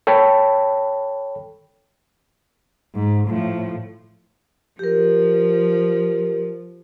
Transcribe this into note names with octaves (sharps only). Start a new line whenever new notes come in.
A4 C#5 G5 A5 B5
G#2
A2 F3
F3 G4 A#4